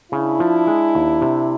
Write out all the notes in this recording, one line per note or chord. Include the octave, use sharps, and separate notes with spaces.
C#3 D4 E4
F3
G#3
D#2
C3